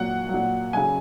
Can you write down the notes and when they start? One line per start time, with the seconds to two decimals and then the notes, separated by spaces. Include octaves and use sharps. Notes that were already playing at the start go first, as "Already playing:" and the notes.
Already playing: A#2 F#3 F#5
0.29 A#2 F#3
0.73 C#3 F#3 G#5